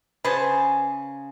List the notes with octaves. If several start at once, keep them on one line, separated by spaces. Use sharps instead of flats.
C#3 G#4 B4 C5 A5